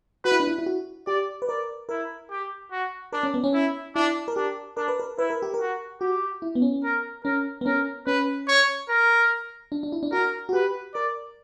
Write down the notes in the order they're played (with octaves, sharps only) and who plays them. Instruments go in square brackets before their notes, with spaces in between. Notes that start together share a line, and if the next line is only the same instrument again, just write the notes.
[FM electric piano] F#4 [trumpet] B4
[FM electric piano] E4
D4
E4
E4
F#4
[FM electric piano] G4 [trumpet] D5
[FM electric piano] B4
[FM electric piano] A#4 [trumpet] D5
[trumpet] E4 [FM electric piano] A#4
[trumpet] G4
F#4
[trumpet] D4 [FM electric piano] A#4
[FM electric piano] C#4
B3
C#4
[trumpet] E4
[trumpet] D4 [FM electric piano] E4
[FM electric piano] A#4
[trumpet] D4 [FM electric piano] G4
[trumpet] D4 [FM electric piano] A#4
[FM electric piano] B4
A#4
[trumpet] E4 [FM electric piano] B4
[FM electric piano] A#4
G4
A#4
[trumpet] F#4
[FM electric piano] F#4 [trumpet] G4
[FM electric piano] E4
B3
C#4
[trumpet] A#4
[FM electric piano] C#4 [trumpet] A#4
[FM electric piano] B3
[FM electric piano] C#4 [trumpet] A#4
[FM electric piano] C#4 [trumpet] B4
[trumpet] C#5
A#4
[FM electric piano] D4
D4
E4
D4
[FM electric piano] F#4 [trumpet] A#4
[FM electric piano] F#4
[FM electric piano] G4 [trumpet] B4
[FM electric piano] A#4 [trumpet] D5